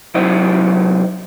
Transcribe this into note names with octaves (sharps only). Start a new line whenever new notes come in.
C2 F#3 E4 C5 D#5